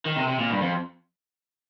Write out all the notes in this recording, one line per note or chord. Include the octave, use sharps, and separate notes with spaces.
D#3
C3
C3
A#2
G2
F2